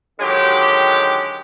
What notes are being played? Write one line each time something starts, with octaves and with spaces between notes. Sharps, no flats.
D3 D#3 F#3 G#3 G4